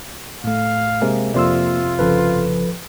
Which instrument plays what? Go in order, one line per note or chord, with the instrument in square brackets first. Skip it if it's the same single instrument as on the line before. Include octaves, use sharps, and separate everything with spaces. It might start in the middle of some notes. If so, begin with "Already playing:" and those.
[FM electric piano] A2 A3 [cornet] F5
[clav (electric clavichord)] C3 G#3 A#3
[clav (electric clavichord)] F2 C3 [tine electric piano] A#3 [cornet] F4 [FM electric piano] D5 C6 E6
[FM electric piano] G1 C#3 [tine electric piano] F3 A4 B4